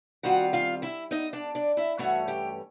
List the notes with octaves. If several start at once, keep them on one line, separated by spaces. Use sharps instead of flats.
D#3 G3 C4 F4 F#4 F#5
F4 F5
E4 E5
D#4 D#5
D4 D5
D4 D5
E4 E5
G2 E3 A3 C#4 F#4 F#5
G4 G5